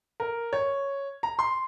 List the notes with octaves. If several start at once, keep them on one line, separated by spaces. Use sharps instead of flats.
A#4
C#5
A#5
C6